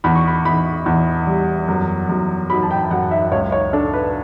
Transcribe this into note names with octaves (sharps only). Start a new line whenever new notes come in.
E2 B5
C#6
B5
E2 B5
E2
G3
F#2
F#2
F#3 B5
A5
G5
F#2 F#5
E5
C#2 C#5
C#5
D4 A4
B4